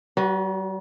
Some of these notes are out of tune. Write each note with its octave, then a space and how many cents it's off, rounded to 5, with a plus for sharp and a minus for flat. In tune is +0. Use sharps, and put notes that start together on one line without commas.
G3 -45 F#4 +0 B4 +0